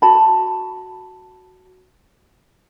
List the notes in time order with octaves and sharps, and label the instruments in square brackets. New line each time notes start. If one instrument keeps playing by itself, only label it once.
[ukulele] F#4 A5 B5